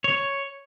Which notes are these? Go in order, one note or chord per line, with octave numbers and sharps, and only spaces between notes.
C#5